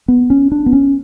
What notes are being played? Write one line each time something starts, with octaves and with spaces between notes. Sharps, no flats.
B3
C#4
D4
B3
C#4